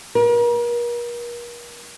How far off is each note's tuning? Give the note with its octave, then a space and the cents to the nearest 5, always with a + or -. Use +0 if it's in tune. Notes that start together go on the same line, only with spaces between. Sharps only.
A#4 +40